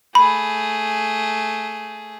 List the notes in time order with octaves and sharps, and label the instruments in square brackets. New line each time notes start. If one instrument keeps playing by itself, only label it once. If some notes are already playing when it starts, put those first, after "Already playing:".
[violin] A3 G#4 [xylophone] B5